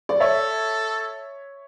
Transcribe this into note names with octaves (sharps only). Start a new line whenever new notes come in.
D5
A4 C#5 E5